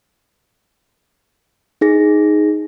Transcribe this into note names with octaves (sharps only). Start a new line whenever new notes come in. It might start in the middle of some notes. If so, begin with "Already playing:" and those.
D#4 G#4 A#6